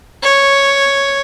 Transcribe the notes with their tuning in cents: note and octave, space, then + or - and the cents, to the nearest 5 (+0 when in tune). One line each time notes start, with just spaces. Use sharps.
C#5 +0